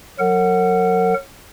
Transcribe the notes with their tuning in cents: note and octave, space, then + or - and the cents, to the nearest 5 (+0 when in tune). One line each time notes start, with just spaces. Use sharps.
F#3 -20 A#4 -35 F#5 +0